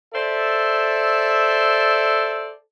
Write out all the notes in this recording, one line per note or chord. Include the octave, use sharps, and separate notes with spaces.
A4 C5 D5 E5